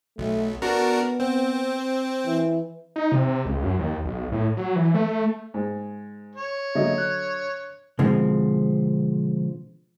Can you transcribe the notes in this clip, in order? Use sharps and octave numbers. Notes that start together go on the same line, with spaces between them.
B1 A3
B3 D4 F#4 A#4
C4
E3
D#4
C3
C3
C#2
F#2
D#2
B1
A2
F#3
E3
A3
G#2
C#5
D3 F#3 A#3 D#5 E5
F#6
B2 D3 F3 G#3 C4